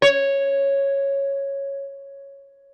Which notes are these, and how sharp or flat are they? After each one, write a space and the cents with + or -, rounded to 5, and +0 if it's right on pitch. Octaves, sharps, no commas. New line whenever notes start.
C#5 -5